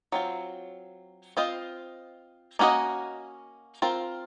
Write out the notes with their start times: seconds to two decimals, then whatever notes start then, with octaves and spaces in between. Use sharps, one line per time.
0.12 F#3 C4 F4
1.37 C4 F4 C5 D#5
2.59 A#3 C#4 F#4 C5 D#5
3.82 C4 F4 A#4